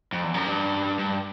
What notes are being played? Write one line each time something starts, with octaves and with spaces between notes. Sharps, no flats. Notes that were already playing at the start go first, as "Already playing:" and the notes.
F2
E2
F#2
G2
G2